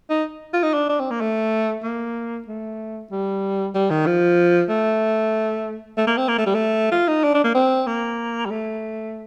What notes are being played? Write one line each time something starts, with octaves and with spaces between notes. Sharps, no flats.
D#4
F4
D#4
D4
D4
C4
A#3
A3
A#3
A3
G3
G3
D#3
F3
A3
A3
A#3
C4
A#3
A3
G3
A3
F4
D#4
D4
D4
A#3
C4
A#3
G3
A3